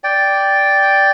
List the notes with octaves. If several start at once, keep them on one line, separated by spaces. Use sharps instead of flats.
D5 G5